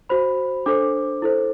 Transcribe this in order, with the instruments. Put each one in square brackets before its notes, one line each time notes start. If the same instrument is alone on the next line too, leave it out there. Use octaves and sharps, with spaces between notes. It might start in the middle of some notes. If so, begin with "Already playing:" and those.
[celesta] F#4 C5 B5
D4 A4 C5 D6
E4 A4 C5